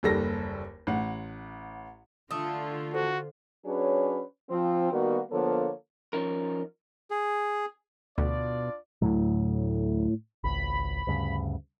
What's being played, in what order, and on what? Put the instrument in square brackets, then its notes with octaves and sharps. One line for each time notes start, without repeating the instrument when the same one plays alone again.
[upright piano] F#1 D#2 G3 A4 A#6
A1 F#5
[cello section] D3 F4 [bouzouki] A3 [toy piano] D6 D#6
[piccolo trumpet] F#4 [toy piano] A4 C5
[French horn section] F#3 C#4 D4 G#4 B4 C#5
F3 C4
D#3 G3 A#3 B3 F#4
D3 F3 A#3 B3 A4 C#5
[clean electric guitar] F3 C#4 D#4 A#4
[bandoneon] G#4
[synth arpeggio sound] D2 [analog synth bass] B2 [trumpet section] D4 F4 D5
[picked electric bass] D2 F#3 [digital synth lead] A2
[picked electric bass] G#1 C#2 [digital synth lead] B5
[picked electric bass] D2 G2 C#3